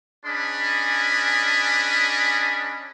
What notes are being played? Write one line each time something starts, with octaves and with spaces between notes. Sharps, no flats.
C#4 D4 G#4 D#5 B5